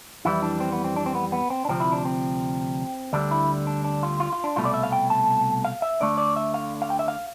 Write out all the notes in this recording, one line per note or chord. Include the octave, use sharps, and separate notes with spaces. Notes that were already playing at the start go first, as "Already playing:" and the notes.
F2 E3 G3 E4
D4
C4
B3
C4
D4
C4
B3
B3
C4
D4
D2 C3 F3 C4
E4
D4
C4
D2 D3 G3 D4
E4
D4
D4
F4
F4
F4
D4
C2 B2 A3 F4
D5
E5
F5
G5
A5
F5
E5
D2 D3 A3 D5
D5
E5
F5
F5
G5
E5
F5